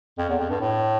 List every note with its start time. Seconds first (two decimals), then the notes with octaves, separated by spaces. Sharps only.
0.18 F2
0.29 E2
0.40 F2
0.50 G2
0.61 A2